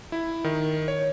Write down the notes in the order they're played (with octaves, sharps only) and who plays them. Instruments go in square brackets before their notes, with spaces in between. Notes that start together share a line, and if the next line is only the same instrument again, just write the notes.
[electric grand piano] E4
D#3
C#5